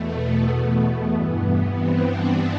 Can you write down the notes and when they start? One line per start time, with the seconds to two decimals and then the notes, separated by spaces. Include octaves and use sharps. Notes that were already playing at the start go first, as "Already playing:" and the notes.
Already playing: E2 B2 A3
0.19 B3
1.12 G2 E3
1.75 C4
2.06 D4